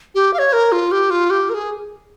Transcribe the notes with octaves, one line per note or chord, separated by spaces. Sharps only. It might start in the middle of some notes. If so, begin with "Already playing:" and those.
G4
F5
C#5
A#4
F4
G4
F4
G4
A#4
G#4